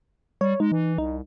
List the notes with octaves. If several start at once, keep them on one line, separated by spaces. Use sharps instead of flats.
G3 C#5
G#3 D#4
E3
C2 D#4